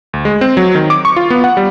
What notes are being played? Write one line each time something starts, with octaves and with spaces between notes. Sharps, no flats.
D2
G#3
C4
F#3
D#3
D6
C#6
F4
B3
F#5
G3